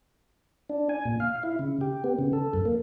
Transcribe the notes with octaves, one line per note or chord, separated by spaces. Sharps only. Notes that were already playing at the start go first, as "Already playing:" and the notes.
D4
G#5
A#2
F5
E4
C#3
G4
B3
C#3
A4
F#2
A#3